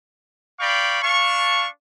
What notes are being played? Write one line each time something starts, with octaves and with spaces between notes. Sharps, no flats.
D5 F5 G5 B5 C#6
D4 F5 A5 C#6